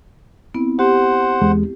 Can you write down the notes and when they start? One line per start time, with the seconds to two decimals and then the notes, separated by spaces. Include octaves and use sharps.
0.54 B3 C4 E4
0.79 G4 C5 F#5
1.41 E2 G#3